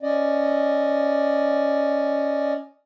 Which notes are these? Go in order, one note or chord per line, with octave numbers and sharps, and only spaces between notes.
C#4 D5 D#5